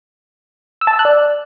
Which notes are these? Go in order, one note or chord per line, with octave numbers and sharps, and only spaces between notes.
E6
A5
E6
F#6
D5